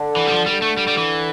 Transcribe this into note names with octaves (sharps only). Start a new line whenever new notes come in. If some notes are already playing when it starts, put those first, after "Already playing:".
Already playing: D3
E3
G3
F3
D3 G3
A3
G3
G3
E3